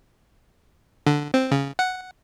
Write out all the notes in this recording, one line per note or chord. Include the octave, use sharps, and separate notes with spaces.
D3
C4
C#3
F#5